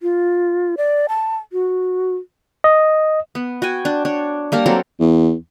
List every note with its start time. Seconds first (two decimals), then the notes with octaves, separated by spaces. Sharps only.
0.02 F4
0.77 D5
1.09 A5
1.53 F#4
2.64 D#5
3.35 B3
3.62 F#4 G5 G#5
3.85 D4
4.05 D4 C#5
4.52 G3 A#3 A#4 A5
4.66 F#3 C4 A4 A#4
5.00 E2